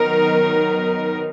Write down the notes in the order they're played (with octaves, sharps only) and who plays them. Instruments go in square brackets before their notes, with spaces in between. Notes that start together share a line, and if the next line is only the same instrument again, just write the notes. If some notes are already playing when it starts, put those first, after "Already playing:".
Already playing: [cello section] D#3 F#3 B3 D#4 A#4